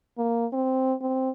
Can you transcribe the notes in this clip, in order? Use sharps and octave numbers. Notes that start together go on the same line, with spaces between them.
A#3
C4
C4